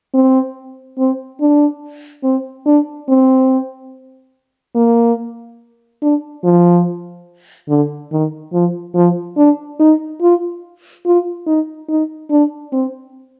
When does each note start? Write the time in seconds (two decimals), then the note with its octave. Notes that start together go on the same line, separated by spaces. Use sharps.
0.14 C4
0.98 C4
1.41 D4
2.23 C4
2.66 D4
3.08 C4
4.75 A#3
6.02 D4
6.44 F3
7.69 D3
8.12 D#3
8.53 F3
8.95 F3
9.37 D4
9.80 D#4
10.22 F4
11.06 F4
11.47 D#4
11.89 D#4
12.31 D4
12.73 C4